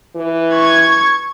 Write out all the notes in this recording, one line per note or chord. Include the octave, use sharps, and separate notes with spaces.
E3
C#6 G#6